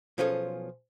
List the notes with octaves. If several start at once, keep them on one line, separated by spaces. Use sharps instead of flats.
B1 F3 C#4 F4 G#4 A4